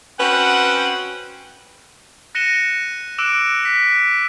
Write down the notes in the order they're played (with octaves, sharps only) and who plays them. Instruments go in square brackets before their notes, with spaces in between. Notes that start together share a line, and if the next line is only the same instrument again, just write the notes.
[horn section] C4 C#4 F#4 B4 F#5 G5
[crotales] F#6 A#6 C#7 D#7 E7 G7
D6 E6 F#6 D7 E7
F#6 B6